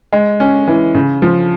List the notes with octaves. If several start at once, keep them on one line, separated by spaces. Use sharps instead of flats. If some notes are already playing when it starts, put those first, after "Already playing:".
G#3
C#4
E3
C#3
F3